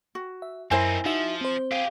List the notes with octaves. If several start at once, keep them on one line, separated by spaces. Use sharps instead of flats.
F#4
E5
F#2 C4 D#4 E4 A#4 C5 G#5
F3 D#4 F#4 E5
C4 C5
G4 G#4 F5